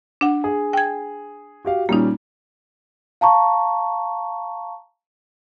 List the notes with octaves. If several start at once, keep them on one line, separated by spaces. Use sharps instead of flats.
D4 F#5
G#4
G5 G#6
F#4 G4 F5
A#2 G3 A#3 C#4 D#4
F5 A5 A#5 C#6